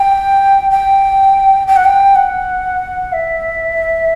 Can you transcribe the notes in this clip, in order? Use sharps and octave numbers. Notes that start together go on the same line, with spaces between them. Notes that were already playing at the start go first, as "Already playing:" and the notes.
Already playing: G5
G5
G5
F#5
G5
F#5
E5